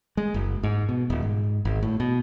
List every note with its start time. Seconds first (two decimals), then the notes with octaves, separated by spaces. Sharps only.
0.17 G#3
0.34 F#1
0.63 G#2
0.89 B2
1.10 D#1
1.22 G#2
1.65 G#1
1.83 A2
2.00 B2